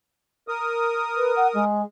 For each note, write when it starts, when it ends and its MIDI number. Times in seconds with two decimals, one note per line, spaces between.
0.48 1.65 70
0.48 1.65 87
1.16 1.31 71
1.36 1.47 78
1.54 1.82 56